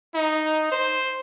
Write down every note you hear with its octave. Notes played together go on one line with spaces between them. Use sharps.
D#4
C5